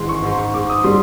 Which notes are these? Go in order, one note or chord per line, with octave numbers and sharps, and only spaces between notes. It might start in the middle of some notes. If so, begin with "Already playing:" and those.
Already playing: G#1 E3 G#3 C6
C#6
G#2 C6
C#6
G#2 D6
D#6
G3 C6